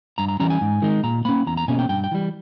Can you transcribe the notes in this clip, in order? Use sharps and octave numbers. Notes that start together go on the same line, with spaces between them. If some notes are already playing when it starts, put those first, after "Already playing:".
G2 A#5
A#5
E3 G3 C#4 A#5
G#5
G#2
D#3 G#3 D#4
A#2 A#5
A#3 C#4 B5
E2 A#5
A#5
B2 A#3 C#4 G#5
G5
G2 G5
G5
E3 G3